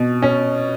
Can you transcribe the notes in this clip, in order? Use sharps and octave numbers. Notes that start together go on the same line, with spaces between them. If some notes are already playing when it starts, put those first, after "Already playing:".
Already playing: B2
C#4